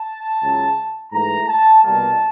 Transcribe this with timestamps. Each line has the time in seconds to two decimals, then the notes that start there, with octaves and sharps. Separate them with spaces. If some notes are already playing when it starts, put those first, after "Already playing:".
Already playing: A5
0.41 C#2 C#3 F#3
1.12 G#2 E3 A3 A#5
1.48 A5
1.83 C2 B2 G3 A#3 A5